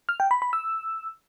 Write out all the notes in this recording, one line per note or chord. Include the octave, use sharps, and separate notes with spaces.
F6
G5
B5
B5
E6